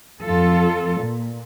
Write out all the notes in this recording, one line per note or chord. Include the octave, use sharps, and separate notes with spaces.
F2 F4 A4
A#2